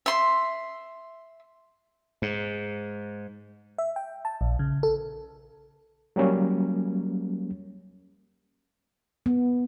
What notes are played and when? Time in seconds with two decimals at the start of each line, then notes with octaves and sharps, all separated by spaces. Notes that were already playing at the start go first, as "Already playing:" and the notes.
0.06 E5 C6
2.22 G#2
3.78 E5
3.96 G5
4.25 A5
4.41 A#1
4.59 C#3
4.83 A4
6.16 F#3 G3 A#3 C#4
9.26 B3